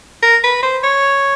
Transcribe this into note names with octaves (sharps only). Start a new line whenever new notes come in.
A#4
B4
C5
C#5